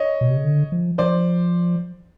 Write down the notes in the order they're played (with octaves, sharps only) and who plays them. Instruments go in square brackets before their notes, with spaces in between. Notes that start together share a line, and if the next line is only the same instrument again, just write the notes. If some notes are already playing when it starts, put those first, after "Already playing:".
Already playing: [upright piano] C#5 D#5
[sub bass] B2
C3
C#3
D3
F3
[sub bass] F3 [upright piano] C5 D5